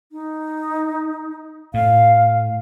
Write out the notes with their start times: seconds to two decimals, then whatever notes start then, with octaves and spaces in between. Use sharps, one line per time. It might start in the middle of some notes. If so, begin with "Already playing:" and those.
0.12 D#4
1.74 A2 F5